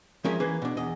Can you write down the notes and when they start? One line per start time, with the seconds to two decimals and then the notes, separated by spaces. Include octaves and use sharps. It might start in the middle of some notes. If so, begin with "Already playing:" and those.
0.24 F3 G#3 C#4 A#4 E5
0.40 E3 A#3 G#4 B4
0.62 B2 D4
0.77 E2 D#5